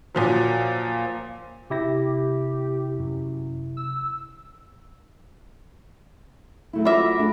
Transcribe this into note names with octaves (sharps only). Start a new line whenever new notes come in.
A#2 F3 F#3
C3 E4 G4 A#6
F#2
E6
F#3 A3 E4
F4 E5 B5 D6 A#6
A3 D4